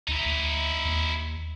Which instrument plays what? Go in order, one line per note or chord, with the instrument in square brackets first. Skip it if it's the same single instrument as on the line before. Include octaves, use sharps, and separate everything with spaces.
[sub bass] D2 [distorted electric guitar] D#4 E4
[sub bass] D2
D#2